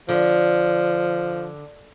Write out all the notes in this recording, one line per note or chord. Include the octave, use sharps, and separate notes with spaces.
D3 F3